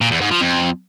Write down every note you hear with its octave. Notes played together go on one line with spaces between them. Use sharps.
A#2
E2
G#2
F3
F2